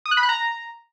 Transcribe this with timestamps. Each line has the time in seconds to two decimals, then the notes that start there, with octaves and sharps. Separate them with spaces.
0.06 D#6
0.11 F#6
0.17 B5
0.23 F#6
0.29 A#5